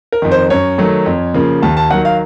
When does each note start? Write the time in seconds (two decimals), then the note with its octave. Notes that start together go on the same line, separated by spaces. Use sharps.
0.12 A#4
0.22 F2 D#3
0.31 C5
0.50 F#2 C#5
0.78 D#3 F#3 A3
1.06 F2
1.34 C#3 F3 A#3
1.62 D#2 A5
1.77 A5
1.90 D#3 F#3 F#5
2.05 F5